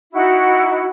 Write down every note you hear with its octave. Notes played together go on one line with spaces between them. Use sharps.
D#4 E4 F#4